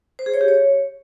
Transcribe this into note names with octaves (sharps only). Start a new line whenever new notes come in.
C5
G#4
C#5
G4
C#5